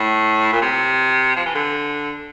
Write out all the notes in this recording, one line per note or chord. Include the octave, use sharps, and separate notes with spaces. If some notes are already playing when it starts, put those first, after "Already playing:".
Already playing: A2
A#2
C3
F3
E3
D3